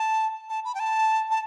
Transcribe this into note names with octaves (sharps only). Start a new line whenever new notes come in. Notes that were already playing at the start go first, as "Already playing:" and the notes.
Already playing: A5
A5
B5
G5
A5
A5